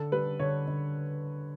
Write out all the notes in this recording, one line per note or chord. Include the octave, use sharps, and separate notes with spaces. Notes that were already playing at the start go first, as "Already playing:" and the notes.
Already playing: D3 A4
G3 B4
D3 C#5
D3